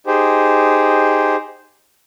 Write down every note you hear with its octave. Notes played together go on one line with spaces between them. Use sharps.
D#4 G4 G#4 C5